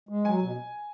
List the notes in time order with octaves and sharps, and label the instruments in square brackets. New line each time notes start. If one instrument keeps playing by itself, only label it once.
[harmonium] G#3
[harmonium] F#3 [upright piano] G#5
[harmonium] B2